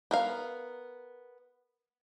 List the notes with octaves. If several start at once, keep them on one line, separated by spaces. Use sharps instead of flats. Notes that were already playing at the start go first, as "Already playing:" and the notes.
B3 A#4 F5